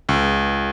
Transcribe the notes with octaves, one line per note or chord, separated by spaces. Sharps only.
C#2